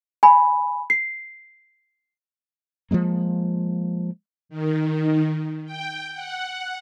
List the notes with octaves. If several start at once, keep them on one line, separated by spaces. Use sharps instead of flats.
G#5 B5
C7
F3 F#3 G#3 A#3
D#3
G5
F#5